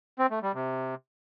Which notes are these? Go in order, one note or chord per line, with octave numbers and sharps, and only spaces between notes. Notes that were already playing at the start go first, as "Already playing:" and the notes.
C4
A3
G3
C3